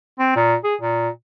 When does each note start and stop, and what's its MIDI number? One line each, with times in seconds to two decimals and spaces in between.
0.19 0.31 60
0.36 0.55 46
0.64 0.75 68
0.81 1.09 46